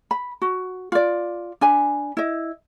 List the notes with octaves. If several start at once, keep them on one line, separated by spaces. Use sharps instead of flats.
B5
F#4
F4 D5
D4 G#5 B5
E4 D#5